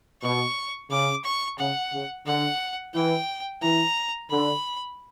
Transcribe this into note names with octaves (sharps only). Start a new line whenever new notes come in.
B2 C#6
C#3 D6
C#6
C#3 F#5
C#3
D3 F#5
E3 G5
E3 A#5
D3 B5